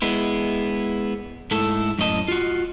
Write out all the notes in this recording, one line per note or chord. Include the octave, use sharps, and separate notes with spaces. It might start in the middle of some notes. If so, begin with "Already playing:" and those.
G#3 B3 E4
G#2 A3 E4 A4
F#2 A2 D#5 A5
F4 F#4